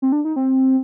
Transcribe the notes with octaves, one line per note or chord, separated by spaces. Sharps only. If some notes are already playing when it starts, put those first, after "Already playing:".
C4
D4
D#4
C4